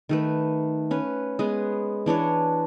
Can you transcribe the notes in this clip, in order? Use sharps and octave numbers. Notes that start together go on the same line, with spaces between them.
D#3 A3 B4
C#4 B4
G#3 B3 G#4 B4
E3 D4 B4 C#5